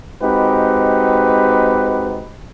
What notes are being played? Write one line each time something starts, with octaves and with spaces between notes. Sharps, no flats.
G#3 C4 D#4 F#4 G4 B4